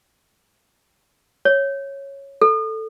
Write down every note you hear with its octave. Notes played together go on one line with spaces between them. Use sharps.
C#5
A4